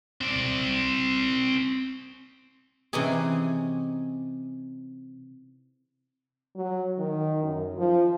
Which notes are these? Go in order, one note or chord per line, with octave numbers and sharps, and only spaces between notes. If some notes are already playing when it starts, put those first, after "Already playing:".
C4 D5
C3 E3 C4 C#4 D#4 G#4
F#3
D#3
F#2
F3